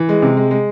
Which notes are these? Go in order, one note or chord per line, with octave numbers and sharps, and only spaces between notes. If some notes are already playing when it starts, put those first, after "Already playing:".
Already playing: E3
G#3
C3
G#3
G#3